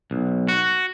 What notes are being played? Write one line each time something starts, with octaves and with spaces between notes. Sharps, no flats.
B1
F#4